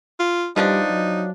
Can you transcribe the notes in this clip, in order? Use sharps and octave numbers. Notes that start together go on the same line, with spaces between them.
F4
B2 F3 G3 D4 D#4
F#3